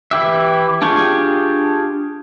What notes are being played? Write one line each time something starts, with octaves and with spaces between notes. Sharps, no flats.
E3 E4 G4 E5
D4 F4 G4 G#4 C#6